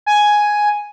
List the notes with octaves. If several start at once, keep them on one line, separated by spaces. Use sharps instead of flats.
G#5